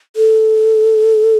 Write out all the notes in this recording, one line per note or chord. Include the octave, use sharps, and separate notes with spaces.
A4